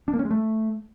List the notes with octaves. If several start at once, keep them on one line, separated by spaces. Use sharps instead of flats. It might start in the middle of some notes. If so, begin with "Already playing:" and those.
D4
A#3
C#4
G#3
A3